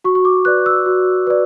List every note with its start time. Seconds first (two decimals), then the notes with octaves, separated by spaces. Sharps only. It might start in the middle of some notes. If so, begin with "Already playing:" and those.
0.04 F#4 C#6
0.15 C#6
0.25 D6
0.45 B4 D5 F#6
0.66 E6
0.86 F#4
1.27 B4 D5